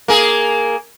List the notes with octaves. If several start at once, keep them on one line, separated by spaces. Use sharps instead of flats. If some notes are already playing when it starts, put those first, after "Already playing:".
A#3 G#4